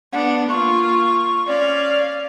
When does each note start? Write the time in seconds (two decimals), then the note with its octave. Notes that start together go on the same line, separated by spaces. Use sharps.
0.12 B3 D4 F#5
0.49 A#3 F4 C#6
1.47 C#4 D5 F5